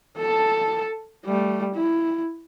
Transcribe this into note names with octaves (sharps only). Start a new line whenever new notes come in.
A4 A5
G3 A3
E4